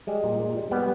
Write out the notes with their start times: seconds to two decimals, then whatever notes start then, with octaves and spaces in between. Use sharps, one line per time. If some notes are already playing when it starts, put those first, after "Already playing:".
0.07 G3 G#3
0.24 A#2
0.39 A#2
0.56 G3
0.71 G3 B3